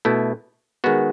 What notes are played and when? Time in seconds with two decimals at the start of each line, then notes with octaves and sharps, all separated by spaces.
0.05 B2 A3 E4
0.84 D#3 G#3 B3 F#4